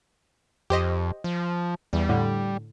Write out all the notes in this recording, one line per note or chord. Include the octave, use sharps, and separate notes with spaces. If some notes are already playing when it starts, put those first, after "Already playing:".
F2 G4 C5 D#5
F3
E2 G3
A2 D3